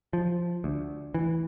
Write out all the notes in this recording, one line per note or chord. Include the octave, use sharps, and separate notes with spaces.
F3
D2
E3